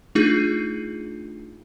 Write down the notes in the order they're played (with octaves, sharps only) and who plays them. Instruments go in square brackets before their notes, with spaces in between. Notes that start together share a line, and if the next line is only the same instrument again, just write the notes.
[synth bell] A3 D4 D#4 F4 G#4